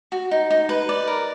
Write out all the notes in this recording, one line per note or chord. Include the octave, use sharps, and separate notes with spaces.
F#4
D#4
D#4
B4
D5
A#4